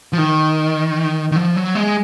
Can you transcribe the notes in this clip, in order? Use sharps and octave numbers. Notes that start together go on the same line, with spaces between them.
F3
D#3
D#3
F3
F#3
G#3